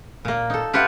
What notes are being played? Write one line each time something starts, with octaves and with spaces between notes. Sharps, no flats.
A#2 A#3
D#4 A4
F4 G4 B4 E5 F#5